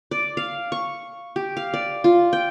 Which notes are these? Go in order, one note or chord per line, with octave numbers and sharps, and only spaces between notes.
D5
F5
C#6
G4
F5
D5
F4
G5